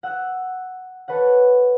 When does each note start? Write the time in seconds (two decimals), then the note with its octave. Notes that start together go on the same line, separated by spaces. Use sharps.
0.03 F#5 E6 F#6
1.08 A4 B4 C#5 F#5